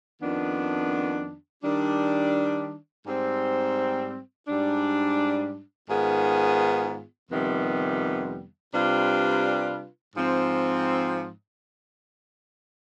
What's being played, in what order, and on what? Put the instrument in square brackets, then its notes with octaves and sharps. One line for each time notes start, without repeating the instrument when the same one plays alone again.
[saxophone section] F2 D#3 B3 D4
D#3 G3 D4
G#2 G3 C4
G#2 G3 D4
G#2 D#3 B3 F4 G#4
F2 C3 D#3 G3 B3
C3 G3 D4 F4 B4
G#2 F3 C4